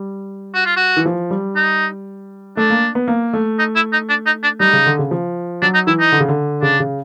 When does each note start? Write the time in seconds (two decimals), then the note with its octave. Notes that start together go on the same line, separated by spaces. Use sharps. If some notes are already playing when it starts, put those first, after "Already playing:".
Already playing: G3
0.55 F#4
0.65 F4
0.76 F#4
0.97 E3
1.06 F3
1.31 G3
1.56 D#4
2.57 A3 D4
2.70 A#3
2.95 B3
3.08 A#3
3.33 A3
3.59 D#4
3.75 E4
3.92 D#4
4.09 D4
4.26 D#4
4.43 D4
4.60 G3 D#4
4.73 C#3
4.86 D3
4.99 C#3
5.11 F3
5.62 F#3 D4
5.74 D#4
5.87 E3 E4
6.00 D#4
6.12 D3
6.20 C#3
6.28 D3
6.62 C#3 D4
6.80 C#3